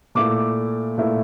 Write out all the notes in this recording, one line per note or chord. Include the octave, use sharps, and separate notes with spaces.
A#2 A3 E4 D6
A#2 A3 E4